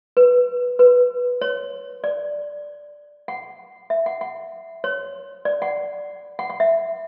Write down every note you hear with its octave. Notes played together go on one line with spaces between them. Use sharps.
B4
B4
C#5
D5
F#5
E5
F#5
F#5
C#5
D5
F#5
F#5
F#5
E5